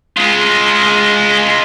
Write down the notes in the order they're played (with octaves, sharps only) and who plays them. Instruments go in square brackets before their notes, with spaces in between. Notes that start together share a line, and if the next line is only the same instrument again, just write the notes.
[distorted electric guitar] G#3 F4